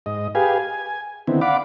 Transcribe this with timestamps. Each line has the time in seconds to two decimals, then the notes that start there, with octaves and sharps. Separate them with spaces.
0.06 G#2 D#5
0.35 G4 G#4 B4 F5 G#5
0.59 G#5
1.27 D3 D#3 B3 C4 E4
1.41 D5 F5 F#5 B5 D6